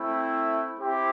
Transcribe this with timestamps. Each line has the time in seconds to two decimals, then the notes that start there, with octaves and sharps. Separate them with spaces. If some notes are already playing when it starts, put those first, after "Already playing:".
Already playing: A3 C4 E4
0.80 C4 E4 G4